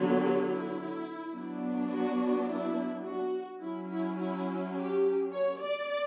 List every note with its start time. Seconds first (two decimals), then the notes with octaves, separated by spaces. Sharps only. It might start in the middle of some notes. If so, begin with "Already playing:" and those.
Already playing: D3 F#3 B3
0.18 G4
0.47 E4
1.32 F#3 B3 D4
1.89 F#4
2.46 E4
3.03 F#4
3.60 F#3 C#4 E4
3.89 E4
4.17 E4
4.74 G4
5.32 C#5
5.59 D5